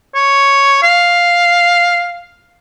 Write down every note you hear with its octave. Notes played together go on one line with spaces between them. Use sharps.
C#5
F5